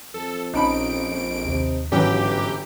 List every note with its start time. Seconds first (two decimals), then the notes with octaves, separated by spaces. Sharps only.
0.14 F2 A4
0.54 A#1 C#4 D#4 A5 B5 D7
1.45 D#2 C3
1.92 G1 G#2 E3 F#3 C#4 G4 G5